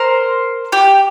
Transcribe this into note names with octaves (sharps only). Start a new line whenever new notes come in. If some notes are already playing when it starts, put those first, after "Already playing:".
Already playing: A#4 C5
G4